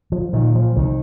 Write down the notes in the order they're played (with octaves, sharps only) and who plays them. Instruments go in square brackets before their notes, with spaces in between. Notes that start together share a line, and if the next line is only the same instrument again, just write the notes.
[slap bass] F3
A#2 D#3
F3
C2 D#3